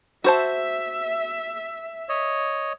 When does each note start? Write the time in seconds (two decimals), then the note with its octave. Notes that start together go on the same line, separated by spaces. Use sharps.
0.24 F#4 C5 E5 A5
2.09 C#5 D#5